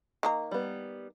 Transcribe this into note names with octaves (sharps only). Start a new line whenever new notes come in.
D#3 A#3 A#5
G3 B3